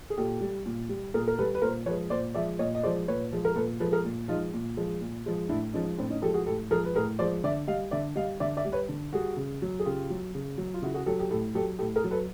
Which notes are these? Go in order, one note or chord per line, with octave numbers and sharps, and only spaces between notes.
G#4
A#2 G4 A4
G3
A#2
G3
A#2 G#4 A#4
A#4
G3 A4 B4
B4
A#2 A#4 C5
F3 G#3 B4 C#5
A#2 C5 D5
F3 G#3 D5 E5
A#2 C#5 D#5
D#5
F3 G#3 C5 D5
A#2 B4 C#5
F3 G#3
A#4
A#2 A4 B4
F3 G#3 A4 B4
G#4 A#4
A#2
F3 G#3 D#4 F4
A#2
F3 G#3
A#2
F3 G#3
A2 D4 E4
F3 G#3 C#4 D#4
A2 C4 D4
C#4 D#4
F3 G#3 G4 A4
F#4 G#4
A2 G4 A4
F3 G#3 G#4 A#4
B4
A2 G#4 A#4
F3 G#3 C5 D5
D3 D5 E5
G3 D#5 F5
D3 D5 E5
G3 D#5 F5
D3 D5 E5
D5 E5
G3
B4 C#5
D3
G3 F#4 G#4
C#3
F#3
G#4
C#3 F4 G4
F#3
C#3
F#3
F4
C#3 E4 F#4
F#4 G#4
F#3 G4 A4
G4 A4
A2 G4 A4
F#3 G4 A4
A2 G4 A4
G#4 A#4
F#3
A4 B4